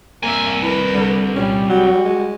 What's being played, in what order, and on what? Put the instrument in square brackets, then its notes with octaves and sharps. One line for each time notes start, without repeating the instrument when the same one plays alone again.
[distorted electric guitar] C2 G#5 [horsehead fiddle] A#3 E5 [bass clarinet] A#4
[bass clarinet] E4 [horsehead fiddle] A#4 B4
[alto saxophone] D3 [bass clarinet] G3
[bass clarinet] A#2 [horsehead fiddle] G3 [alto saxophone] C#4
[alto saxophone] F#3 [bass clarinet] F#4
[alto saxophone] G#3